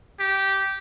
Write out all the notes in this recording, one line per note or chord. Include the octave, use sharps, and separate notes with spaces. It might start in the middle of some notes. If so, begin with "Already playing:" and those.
G4